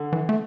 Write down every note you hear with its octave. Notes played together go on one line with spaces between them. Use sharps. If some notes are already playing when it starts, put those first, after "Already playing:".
Already playing: D3
E3
A3